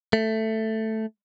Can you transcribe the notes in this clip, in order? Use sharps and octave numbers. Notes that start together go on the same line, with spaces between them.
A3